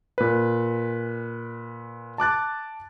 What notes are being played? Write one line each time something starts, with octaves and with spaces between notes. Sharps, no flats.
A#2 B4
A5 D6 F#6 A6